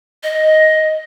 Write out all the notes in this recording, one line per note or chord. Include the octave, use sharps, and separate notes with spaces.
D#5